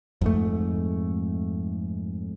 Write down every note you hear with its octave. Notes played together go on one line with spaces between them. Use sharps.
F2 G#2 A3